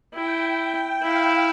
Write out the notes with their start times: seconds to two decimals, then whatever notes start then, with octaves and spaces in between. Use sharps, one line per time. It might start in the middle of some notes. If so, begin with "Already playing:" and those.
0.14 E4 G5
1.02 E4 F5